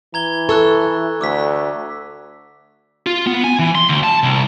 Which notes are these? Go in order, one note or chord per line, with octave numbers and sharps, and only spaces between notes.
E3 A#5 G#6 G7
A4 C#6 E6 F#6
D2 D6 E6 B6
F4
B3
G#5
E3
C6
D2
A5
C2